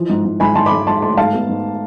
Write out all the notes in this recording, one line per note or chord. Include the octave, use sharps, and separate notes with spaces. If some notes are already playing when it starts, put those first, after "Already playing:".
Already playing: E3 F3
G#2
G#2
G#2 G#5 B5
G#2 A5 C6
B5 D6
G#2
G#2 A5 C6
A3 A5 C6
G#2 F5 A5
B3
G#2